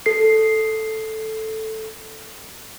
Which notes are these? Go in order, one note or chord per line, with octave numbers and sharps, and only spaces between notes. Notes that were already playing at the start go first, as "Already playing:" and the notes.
A4 C7